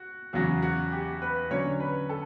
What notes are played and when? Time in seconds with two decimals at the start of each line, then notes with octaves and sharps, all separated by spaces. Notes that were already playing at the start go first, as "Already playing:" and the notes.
Already playing: F#4
0.33 E2 C#3 F#3 F#4
0.62 F#4
0.92 G4
1.22 B4
1.50 D3 F#3 C#4 C#5
1.80 B4
2.09 A4